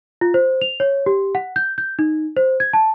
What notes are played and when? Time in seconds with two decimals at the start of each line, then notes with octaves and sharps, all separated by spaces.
0.21 F4
0.34 C5
0.62 F7
0.80 C#5
1.06 G4
1.35 F#5
1.56 G6
1.78 G6
1.99 D#4
2.37 C5
2.60 G#6
2.73 A5